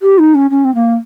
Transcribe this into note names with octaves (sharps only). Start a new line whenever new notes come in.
G4
D#4
C#4
C#4
C4
A#3